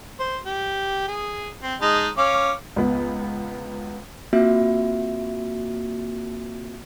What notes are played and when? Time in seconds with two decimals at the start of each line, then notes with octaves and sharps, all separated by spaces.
0.20 C5
0.46 G4
1.08 G#4
1.63 C4
1.82 G#3 D#4 A5
2.18 C#4 F5 D6
2.76 C#2 B3
4.33 A#3 C4 F4 F#4 E5